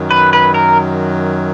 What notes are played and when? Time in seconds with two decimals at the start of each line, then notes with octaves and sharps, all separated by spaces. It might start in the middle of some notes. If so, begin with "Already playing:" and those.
Already playing: F#2 D#3 F#3
0.11 B4
0.33 B4
0.54 A#4